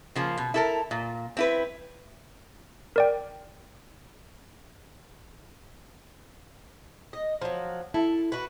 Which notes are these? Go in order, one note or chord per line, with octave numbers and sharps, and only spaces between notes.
C#3 F3 A#3
B2
E4 A4 A#4
A#2
C4 E4 B4
A#4 D5 G5
D#5
F3 F#3
E4 A4
F#4 B4